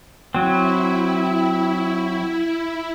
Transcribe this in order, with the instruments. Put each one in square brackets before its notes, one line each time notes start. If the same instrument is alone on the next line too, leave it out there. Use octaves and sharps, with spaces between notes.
[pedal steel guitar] F#3 C4 [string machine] E4